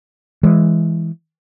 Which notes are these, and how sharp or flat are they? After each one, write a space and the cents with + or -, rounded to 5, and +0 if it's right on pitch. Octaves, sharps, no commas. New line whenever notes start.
E3 +0 G#3 +0